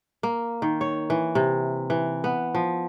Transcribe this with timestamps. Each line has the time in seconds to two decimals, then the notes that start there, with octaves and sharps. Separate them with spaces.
0.23 A#3
0.62 D#3
0.81 C#5
1.10 E3
1.35 C3
1.90 E3
2.24 B3
2.55 F3